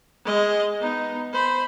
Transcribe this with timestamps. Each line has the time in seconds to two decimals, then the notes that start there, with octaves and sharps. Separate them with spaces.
0.25 G#3 D#5
0.80 B3 D#4
1.33 C5 B5